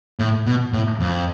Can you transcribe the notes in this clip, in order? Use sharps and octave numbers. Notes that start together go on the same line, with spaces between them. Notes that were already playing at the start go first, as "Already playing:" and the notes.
A2
B2
A2
F2